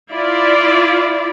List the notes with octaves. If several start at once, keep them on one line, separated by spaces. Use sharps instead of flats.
E4 F4 D5